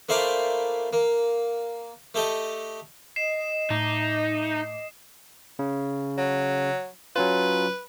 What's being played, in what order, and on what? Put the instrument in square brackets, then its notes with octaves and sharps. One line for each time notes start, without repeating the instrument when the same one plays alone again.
[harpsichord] A3 A#3 E4 C5 D5 F5
A#3
A3 G4 A4 D#5
[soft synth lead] D#5 [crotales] C7 E7
[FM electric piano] A2 E5 D6 [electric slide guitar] D#4
[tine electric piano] C#3
[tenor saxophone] F#3
[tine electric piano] F#3 C#4 F4 [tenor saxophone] B4